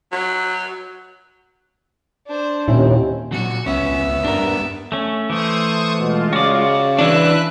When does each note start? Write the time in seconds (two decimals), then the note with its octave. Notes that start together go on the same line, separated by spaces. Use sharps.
0.12 F#3
2.27 D4 C5
2.68 D#2 A#2 C4 C#4 E4
3.32 A#2 F#3 F#4
3.66 C#2 B3 C#4 E5
4.25 G2 B3 D4 A#4
4.92 A3 C#4
5.30 E3 A3 C5 C#6 D#6
5.99 B2 G#3 F4
6.33 C#3 F#4 D5
6.99 E3 D4 B4 E5 F#6